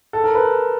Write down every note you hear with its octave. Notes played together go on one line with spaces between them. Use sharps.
A4
A#4
B4